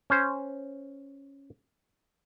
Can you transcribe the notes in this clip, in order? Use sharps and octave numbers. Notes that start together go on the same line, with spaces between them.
C#4 C5